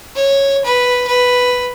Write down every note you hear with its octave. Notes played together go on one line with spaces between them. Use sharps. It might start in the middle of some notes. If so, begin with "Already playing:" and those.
C#5
B4
B4